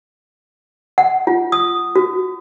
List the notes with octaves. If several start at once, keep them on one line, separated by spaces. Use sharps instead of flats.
F#5
F4
D#6
F#4